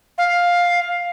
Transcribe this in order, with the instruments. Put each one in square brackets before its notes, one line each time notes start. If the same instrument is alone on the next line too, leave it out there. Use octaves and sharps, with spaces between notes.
[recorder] F5